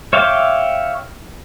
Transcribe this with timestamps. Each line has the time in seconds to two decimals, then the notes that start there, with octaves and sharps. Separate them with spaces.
0.13 C#5 E5 F5 G5 D6